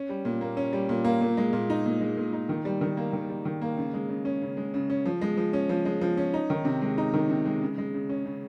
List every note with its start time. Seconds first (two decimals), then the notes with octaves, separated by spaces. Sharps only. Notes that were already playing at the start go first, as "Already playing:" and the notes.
Already playing: C#4
0.09 G3
0.25 A#2
0.41 A#3
0.57 C#4
0.73 G3
0.89 A#2
1.04 A#3
1.21 A#2
1.37 G#3
1.53 A#2
1.70 D#4
1.86 A#2
2.01 G#3
2.17 A#2
2.33 D#4
2.49 D#3
2.65 G3
2.81 D#3
2.97 A#3
3.13 D#3
3.30 G3
3.45 D#3
3.61 A#3
3.77 C#3
3.93 G#3
4.09 C#3
4.25 C#4
4.42 C#3
4.57 G#3
4.74 C#3
4.90 C#4
5.05 F3
5.21 G#3
5.37 F3
5.53 C#4
5.69 F3
5.85 G#3
6.01 F3
6.17 C#4
6.34 D#4
6.50 D#3
6.65 C3
6.82 G#3
6.98 D#4
7.14 D#3
7.30 C3
7.45 G#3
7.61 C#3
7.78 G#3
7.94 C#3
8.09 C#4
8.26 C#3